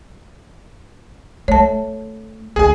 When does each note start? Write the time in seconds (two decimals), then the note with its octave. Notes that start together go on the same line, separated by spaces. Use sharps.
1.48 A3 C#5 A5
2.56 D2 G#4 G#5